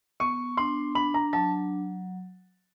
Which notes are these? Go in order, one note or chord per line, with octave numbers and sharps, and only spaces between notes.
B3 C#6
D4 C6
D4 B5
A#5
F#3 A5